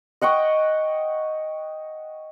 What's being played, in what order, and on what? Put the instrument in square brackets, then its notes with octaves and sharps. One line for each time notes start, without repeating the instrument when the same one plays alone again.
[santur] D#5 F#5 G5 C#6